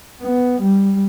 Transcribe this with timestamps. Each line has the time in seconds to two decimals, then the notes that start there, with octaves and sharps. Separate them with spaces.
0.21 B3
0.62 G3